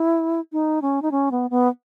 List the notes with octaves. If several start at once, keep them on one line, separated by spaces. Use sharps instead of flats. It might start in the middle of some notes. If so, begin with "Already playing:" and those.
Already playing: E4
D#4
C#4
D#4
C#4
B3
B3